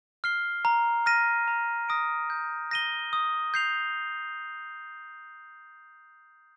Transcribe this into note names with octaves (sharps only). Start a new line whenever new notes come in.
F6 C7 G7
A#5
F6 A#6 D#7
A#5
D#6 A#6 D7
G6
A#6 D#7 G7
D#6
G6 C7 F7